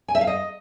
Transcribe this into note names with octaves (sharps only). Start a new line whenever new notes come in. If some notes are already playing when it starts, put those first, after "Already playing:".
G#5
E5
F5
D#5